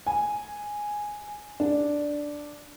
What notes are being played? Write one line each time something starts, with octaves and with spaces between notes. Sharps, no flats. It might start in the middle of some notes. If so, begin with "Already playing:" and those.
G#5
D4